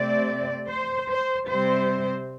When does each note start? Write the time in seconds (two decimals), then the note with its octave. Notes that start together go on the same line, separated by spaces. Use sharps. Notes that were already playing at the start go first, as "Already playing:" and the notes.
Already playing: C3 A3 C4 D5
0.70 C5
1.10 C5
1.49 C3 G3 C4 C5